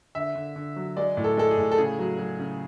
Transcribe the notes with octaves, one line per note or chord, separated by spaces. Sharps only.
D3 E5
D3
D3
F#3
G#3 D5
A2
A4
G#3 A4
G#4
A2
A4
C#3 G#4
F#3
F#3
C#3